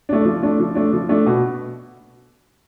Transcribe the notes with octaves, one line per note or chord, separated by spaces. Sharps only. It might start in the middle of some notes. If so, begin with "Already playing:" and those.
A3 D4
F3
A3 D4
F3
A3 D4
F3
A3 D4
B2